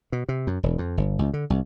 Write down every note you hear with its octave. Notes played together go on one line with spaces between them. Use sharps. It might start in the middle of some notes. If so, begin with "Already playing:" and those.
B2
C3
F#2
E1
F2
G1
C#2
D3
C2